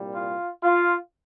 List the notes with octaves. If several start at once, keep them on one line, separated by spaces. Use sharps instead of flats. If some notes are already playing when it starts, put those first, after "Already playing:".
Already playing: C2 A#2 G3
F4
F4